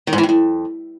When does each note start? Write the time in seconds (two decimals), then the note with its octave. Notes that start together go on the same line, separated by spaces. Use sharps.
0.07 D#3
0.13 G#2
0.18 E3
0.23 G2
0.29 F2